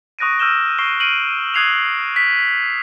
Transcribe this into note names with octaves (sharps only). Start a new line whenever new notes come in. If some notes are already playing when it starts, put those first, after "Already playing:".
C#6 D#6 F#6 A#6 D7 D#7
E6 F6 G6 E7 G7
C#6 A#6 C7 D7 E7 G7
F6 C7 D7 D#7 F#7
D#6 F#6 G#6 C7 D#7 F7
B6